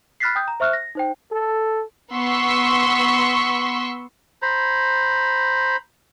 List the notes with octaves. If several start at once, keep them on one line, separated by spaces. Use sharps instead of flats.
B5 F6 F#6 A6 B6 C7
G5 D#6 G6
A#5
C5 E5 C#6 F6 F#6
A#6
D#4 C5 G5
A4
B3 C6 C#6 E6 B6
C5 A#5 B5